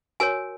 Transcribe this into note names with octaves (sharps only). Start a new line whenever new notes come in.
F#4 A#4 C#5 G#5